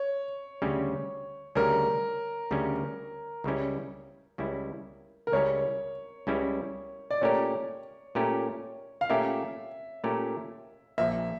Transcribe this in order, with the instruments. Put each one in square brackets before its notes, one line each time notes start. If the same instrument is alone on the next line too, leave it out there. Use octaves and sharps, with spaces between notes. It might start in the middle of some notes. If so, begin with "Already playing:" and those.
Already playing: [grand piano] C#5
[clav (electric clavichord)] D2 C#3 G3 C#4
[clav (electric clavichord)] D2 C#3 G3 C#4 [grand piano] A#4
[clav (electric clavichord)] D2 C#3 G3 C#4
C#2 C#3 G3 C#4 E4
C#2 C#3 G3 C#4 E4
[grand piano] A#4
[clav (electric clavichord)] C#2 C#3 G3 C#4 E4 [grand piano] C#5
[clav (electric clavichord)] C#2 C#3 G3 C#4 E4
[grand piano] D5
[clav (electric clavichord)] A#2 A3 C#4 G4 A#4 [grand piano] C#5
[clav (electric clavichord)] A#2 A3 C#4 G4 A#4
[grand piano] F5
[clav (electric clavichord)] A#2 A3 C#4 G4 A#4 [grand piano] E5
[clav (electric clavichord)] A#2 A3 C#4 G4 A#4
[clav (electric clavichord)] A#1 A#2 F3 A#3 [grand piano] E5